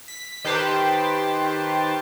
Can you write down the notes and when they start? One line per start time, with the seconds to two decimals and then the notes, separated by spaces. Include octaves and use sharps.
0.08 B6
0.45 D#3 G4 B4 C5 A5